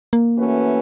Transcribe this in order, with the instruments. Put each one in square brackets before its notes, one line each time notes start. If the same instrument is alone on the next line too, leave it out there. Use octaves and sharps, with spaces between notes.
[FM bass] A#3
[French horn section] E3 A3 C#4 F#4 B4